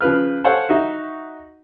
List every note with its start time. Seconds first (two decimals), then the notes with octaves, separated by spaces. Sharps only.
0.01 C#3 F3 B4 F6
0.44 A4 C5 C#5 F5 F#5
0.69 D#4 F#4 E5